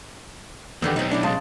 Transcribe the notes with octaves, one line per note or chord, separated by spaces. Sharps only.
E2 D3 D#3 B3 G4 E6
B1 C4 D#4
D4 E4 G4
C#3 G#3 A5 C6